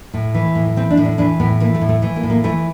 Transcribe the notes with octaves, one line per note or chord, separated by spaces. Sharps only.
A2
E3
A2
E3 C4
D4
A2
D4
E3 D4
A2 B3
E3 A#3
A3
A2
A3
E3 A3
A#3
A2
A#3
E3 A3